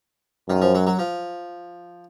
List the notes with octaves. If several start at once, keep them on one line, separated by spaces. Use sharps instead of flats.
F#2 D#3
F3
F#3
F#3
F3